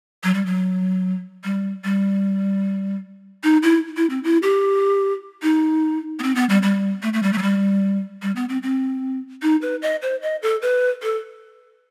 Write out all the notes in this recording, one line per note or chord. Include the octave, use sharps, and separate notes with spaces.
F#3
G3
F#3
G3
G3
D#4
E4
E4
C4
E4
G4
D#4
B3
C4
B3
G3
G3
A3
A3
G3
A3
F#3
G3
G3
B3
C4
C4
D#4
B4
D#5
C5
D#5
A4
B4
A4